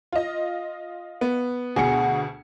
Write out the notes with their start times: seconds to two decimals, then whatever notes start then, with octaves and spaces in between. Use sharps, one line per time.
0.12 F4 D#5
1.21 B3
1.76 D2 B2 G#4 F#5 C#7